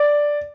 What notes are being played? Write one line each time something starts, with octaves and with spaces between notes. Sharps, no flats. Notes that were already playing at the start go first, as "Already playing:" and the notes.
Already playing: D5